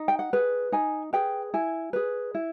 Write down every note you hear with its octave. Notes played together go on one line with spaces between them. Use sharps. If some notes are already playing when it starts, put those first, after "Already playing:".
Already playing: D#4
G5
F#5
G#4 B4
D#4 G#5
G#4 B4 G5
E4 G#5
G#4 B4
E4